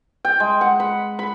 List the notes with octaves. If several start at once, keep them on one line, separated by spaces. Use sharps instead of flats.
G5
G#3
F#5
B5
B5